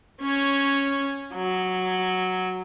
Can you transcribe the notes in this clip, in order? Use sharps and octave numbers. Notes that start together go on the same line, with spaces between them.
C#4 C#5
F#3